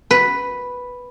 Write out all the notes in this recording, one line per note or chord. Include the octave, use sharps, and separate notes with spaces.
B4